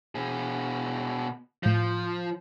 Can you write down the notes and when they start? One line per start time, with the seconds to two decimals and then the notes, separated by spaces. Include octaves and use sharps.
0.15 B2 G#4
1.63 A2 F3 G6